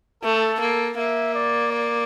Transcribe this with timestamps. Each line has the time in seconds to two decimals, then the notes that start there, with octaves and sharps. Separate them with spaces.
0.23 A3 A4
0.60 A#3
0.97 A#3 E5
1.35 D5
1.72 D5